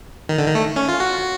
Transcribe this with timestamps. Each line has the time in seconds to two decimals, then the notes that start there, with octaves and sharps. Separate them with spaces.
0.29 D#3
0.38 D3
0.47 D#3
0.55 A3
0.76 C#4
0.88 F4
1.00 F#4